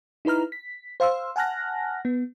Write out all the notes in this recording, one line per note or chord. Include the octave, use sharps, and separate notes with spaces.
D#4 E4 B4 A#5 F6
B6
C5 F5 C6 E6
F#5 G#5 A5 F6 F#6 A#6
B3